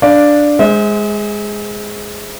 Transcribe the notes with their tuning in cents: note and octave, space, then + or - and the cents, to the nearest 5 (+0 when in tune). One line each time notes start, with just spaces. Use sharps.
D4 +0 D5 +0 F5 +0
G#3 +0 C5 +0 E5 -45